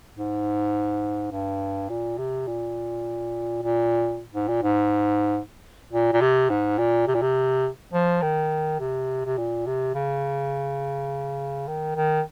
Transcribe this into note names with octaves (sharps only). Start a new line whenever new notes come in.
G#2
G2
A#2
C3
A#2
A#2
G#2
A#2
G#2
A#2
A#2
C3
G#2
A#2
C3
A#2
C3
F3
D#3
C3
C3
A#2
C3
C#3
D#3
D#3